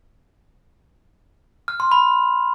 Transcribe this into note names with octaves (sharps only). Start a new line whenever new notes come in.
F6
C6
B5